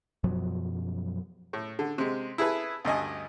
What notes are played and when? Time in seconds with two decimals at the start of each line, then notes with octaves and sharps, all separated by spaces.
0.24 F#2 B2 F3 F#3
1.53 A2
1.79 D3
1.98 C3 G#3
2.38 E4 G#4 A4 B4
2.85 D2 G2 D#5 G#5